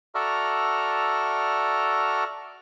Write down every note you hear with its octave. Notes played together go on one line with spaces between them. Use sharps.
F#4 A4 D5 E5 A#5 F6